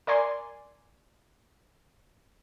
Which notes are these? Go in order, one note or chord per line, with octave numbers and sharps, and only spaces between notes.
A#4 D5 G#5 C6